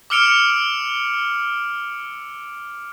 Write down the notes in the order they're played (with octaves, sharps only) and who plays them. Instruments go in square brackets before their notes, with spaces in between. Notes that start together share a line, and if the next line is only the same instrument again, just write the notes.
[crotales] D6 E6 F6 C#7 D7 F7